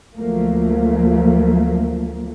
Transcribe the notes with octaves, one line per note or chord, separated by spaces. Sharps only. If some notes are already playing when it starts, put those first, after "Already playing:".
D2 F3 F#3 A3 A#3